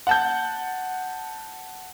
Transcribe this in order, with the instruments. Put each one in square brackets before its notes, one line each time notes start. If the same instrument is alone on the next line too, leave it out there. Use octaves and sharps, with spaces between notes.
[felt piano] F#5 A5 G6